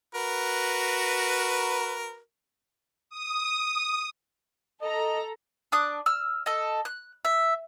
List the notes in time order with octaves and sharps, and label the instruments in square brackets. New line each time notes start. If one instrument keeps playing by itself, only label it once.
[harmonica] F#4 A#4 B4
[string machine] D#6
[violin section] A4 A#5 [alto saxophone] D#5
[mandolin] D4 D6 D#6 F#6
E6 F6
A4 D#5
F#6
E5